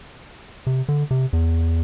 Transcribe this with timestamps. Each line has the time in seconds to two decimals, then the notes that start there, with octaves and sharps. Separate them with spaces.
0.67 C3
0.88 D3
1.11 C3
1.33 E2